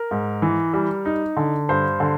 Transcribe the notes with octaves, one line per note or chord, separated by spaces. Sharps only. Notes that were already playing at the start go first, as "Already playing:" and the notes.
Already playing: A#4
G#2
E3
G3
D#4
D3
G2 C5
D3